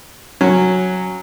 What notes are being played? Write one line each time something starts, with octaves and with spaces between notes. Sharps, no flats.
F#3 C#4